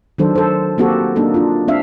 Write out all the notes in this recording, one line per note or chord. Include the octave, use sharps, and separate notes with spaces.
D#3 F#3 D4 A4 C5
A4 C5
A#3 C4 F#4 G4 A4
A#3 D4 D#4 A4
D4 F4
C4 D4 E5 F5